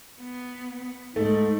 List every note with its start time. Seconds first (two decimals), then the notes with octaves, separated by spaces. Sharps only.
0.21 B3
1.16 G#2 A3 D#4